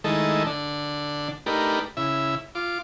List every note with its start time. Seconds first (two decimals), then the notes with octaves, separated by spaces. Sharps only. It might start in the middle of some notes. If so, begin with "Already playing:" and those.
0.04 D#3 G#3 A3 E4 A4 D#5
0.47 D3 D4
1.46 A3 D4 D#4 G4 A#4 B4
1.97 C#3 E4 E5
2.55 F4 D6